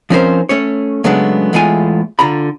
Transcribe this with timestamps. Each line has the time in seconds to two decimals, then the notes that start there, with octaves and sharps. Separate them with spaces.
0.10 F3 C4 C#4 D#4 A#4 C5
0.49 A3 C#4 C#5
1.04 C#3 F#3 G#3 A3 B3 D4
1.53 E2 A2 G#3 A3 F4 G#5
2.19 D3 F4 A#5 B5